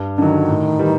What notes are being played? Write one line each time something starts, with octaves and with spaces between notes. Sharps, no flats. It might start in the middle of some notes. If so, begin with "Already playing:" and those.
Already playing: G2
D3 D#3 F#3
A2
E3 G3